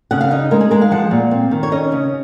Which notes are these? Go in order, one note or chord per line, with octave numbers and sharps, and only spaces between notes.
C#3 F#5
F5
D#4 D#5
G#3 A#4
G#4
G#3 A#4
F5
F3 F#5
A#2
C4
D#3
C#5
C#4 D#5
C#3